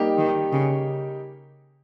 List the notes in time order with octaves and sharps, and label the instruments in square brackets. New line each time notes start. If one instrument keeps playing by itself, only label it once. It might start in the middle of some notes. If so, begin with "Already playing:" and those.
Already playing: [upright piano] G3 A#3 D#4 G4
[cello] D#3
C#3